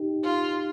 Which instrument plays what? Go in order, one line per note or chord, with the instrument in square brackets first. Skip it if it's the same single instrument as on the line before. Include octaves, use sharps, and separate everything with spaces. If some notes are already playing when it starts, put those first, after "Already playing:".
Already playing: [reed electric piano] D#4 G4
[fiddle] F4